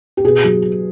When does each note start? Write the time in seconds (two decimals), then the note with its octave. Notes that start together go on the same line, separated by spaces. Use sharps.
0.17 G4
0.24 B2 G#4
0.44 F#3